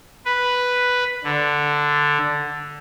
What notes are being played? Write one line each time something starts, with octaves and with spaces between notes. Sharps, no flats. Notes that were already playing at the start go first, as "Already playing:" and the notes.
B4
D3